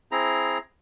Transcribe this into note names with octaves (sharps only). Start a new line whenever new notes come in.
C4 E4 G#4 A#5